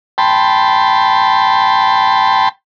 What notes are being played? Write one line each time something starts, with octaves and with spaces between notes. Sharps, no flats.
G5 A5 B5 C6